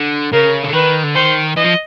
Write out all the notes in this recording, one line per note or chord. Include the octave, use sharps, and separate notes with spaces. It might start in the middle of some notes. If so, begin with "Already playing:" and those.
Already playing: D3
C#3 A#4
D3
D#3 B4
D3
D#3 C5
E3 D#5
F3